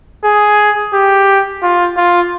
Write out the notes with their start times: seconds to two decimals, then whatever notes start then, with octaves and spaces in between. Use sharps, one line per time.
0.24 G#4
0.94 G4
1.62 F4
1.97 F4